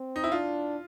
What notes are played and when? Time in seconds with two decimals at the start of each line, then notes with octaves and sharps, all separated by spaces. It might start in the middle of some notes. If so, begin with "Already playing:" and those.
Already playing: C4
0.16 D#4
0.24 E4
0.32 D4 F4